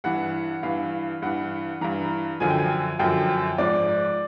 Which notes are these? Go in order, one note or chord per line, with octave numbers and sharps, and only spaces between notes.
G2 E3 F#5
G2 E3 F5
G2 E3 F#5
G2 E3 A#5
F#2 D3 F3 G#5
G5
G#5
F#2 D3 F3 G5
G#2 F3 D5